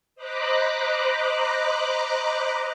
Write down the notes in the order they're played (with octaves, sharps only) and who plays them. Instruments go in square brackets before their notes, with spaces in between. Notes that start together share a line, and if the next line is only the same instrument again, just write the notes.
[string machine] C5 D#5 A#5 B5 D6 F#6